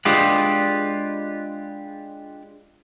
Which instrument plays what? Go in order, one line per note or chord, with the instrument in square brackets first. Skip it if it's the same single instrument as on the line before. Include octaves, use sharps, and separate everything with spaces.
[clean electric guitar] G#3 D4 F4 G4 B4